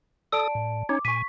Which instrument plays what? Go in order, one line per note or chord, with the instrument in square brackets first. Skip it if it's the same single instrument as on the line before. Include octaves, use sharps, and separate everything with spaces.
[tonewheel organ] A4 D#6 [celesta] D5 A5 D7
[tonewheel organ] A2
[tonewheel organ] C#4 D#4 C#5 [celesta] D6
[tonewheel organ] A#2 G#5 [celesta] C#6 B6